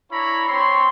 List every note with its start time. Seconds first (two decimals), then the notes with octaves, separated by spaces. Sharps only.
0.11 D4 E4 C#5 A#5 B5
0.47 C4 C#5 C6